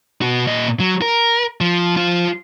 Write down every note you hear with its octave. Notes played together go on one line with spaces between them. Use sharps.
B2 F#4
A#2 D#5
F#3
A#4
F3
F3 F4